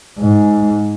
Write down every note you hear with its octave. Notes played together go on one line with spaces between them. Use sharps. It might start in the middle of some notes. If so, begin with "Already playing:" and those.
G#2